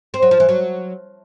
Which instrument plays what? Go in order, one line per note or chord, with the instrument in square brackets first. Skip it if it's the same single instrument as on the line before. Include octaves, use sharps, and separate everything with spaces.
[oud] C4
F#3
F3
E3
F#3